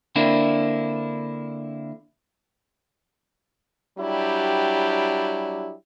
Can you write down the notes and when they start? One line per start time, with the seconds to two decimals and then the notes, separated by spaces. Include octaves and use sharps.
0.16 D3 A#3 C4 D4 E4
3.98 F#3 G3 D4 E4 G4